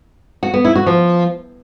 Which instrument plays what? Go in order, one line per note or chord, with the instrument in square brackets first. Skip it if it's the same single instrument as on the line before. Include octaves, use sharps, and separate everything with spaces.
[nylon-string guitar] F#4
B3
E4
F#4
F3